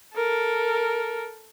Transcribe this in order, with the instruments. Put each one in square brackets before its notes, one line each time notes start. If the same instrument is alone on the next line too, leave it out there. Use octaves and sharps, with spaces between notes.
[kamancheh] A4 A#4